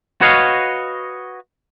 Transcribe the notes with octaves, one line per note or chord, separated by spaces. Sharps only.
F#4 B4 C#5 D#5 F5